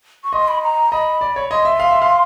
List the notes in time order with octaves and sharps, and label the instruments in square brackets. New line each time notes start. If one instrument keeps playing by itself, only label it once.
[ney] C#6
[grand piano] D#5 [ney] C6
[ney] B5
A#5
[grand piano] D#5 [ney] B5
[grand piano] D5
C#5
[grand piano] D#5 [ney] C6
[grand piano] E5
F5
E5
F5